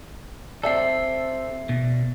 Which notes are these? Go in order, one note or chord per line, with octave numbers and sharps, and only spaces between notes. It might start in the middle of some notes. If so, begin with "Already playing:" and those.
C4 G4 A4 D5 E5 C7
B2